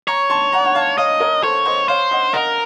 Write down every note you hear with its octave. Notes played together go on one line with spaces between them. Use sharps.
C#5 A#5 C#6
A5 C6
F#5 A#5
F#5
F5 A5
C#5 D#5 F5
A#4 C#5
A4 C5 C#5
C5 D#5
C5 C#5 F5
D#5 F#5
A#4 D#5 F#5